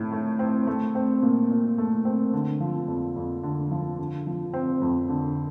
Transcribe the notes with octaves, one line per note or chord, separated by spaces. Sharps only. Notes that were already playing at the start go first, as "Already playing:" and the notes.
Already playing: A2
A3
C4
A3
C4
A#2
A#2
A3
C4
D3
F3
F2
F2
D3
F3
D3
F3
C4
F2
D3